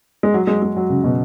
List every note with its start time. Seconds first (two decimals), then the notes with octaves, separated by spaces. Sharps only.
0.23 G#3
0.34 F#3
0.47 G#3
0.62 G#3
0.77 F#3
0.90 C#3
1.04 B2